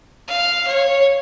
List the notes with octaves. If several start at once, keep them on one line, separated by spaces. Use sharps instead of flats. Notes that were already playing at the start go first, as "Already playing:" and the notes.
F5
C#5